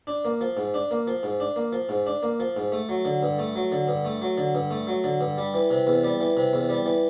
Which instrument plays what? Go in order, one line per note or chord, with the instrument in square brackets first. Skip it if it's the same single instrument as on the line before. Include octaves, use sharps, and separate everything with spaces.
[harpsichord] D4
A#3
F3
G#2
D4
A#3
F3
G#2
D4
A#3
F3
G#2
D4
A#3
F3
G#2
A3
F#3
D3
G2
A3
F#3
D3
G2
A3
F#3
D3
G2
A3
F#3
D3
G2
G3
E3
C3
E2
G3
E3
C3
E2
G3
E3